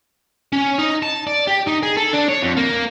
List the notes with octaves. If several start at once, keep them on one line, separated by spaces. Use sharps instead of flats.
C#4
D#4
A5
D5
G4
D#4
G#4
A4
D4
C#5
F2
A#3